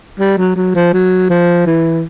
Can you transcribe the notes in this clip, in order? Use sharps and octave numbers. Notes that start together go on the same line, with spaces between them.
G3
F#3
F#3
F3
F#3
F3
E3